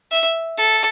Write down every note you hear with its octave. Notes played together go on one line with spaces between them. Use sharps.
E5
A4